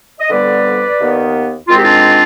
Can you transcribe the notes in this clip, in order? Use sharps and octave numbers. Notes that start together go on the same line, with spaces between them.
D#5
F2 D3 G3 B3 B4 D5
D#2 D#3 B3
G#2 D#3 G#3 C4 F4
G4
D4 F4